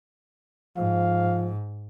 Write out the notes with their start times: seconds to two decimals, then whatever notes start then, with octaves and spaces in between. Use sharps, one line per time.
0.77 G#2 F3 F5